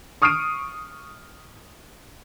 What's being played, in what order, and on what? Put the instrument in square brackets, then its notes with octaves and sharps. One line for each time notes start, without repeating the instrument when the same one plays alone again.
[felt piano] C#6 D#6 F6 C7 D7 D#7